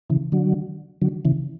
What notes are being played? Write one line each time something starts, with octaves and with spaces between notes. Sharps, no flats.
C#3 E3
D3 F#3
D3 F#3
C#3 E3